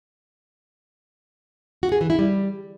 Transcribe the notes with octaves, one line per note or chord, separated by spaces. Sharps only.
F#4
G#4
E3
E4
G3